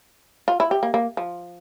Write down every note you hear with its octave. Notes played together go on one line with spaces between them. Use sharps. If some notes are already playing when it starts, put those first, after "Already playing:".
F4
E4
G4
A#3
A#3
F3